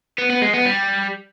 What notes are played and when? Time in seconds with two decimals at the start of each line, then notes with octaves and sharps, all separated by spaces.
0.18 B3
0.30 B3
0.42 G#3
0.54 B3
0.65 G3